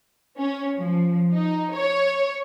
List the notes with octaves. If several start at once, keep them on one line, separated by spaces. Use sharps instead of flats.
C#4
F3
D#4
C#5